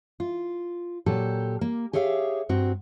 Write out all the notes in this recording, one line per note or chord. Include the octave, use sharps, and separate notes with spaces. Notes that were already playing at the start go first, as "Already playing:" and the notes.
F4
A#2 F#3 G4 A4
A#3
G4 G#4 C#5 E5 F5
G2 C4 F#4